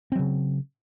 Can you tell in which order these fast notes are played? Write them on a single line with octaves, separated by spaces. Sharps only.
C4 F#3 C#3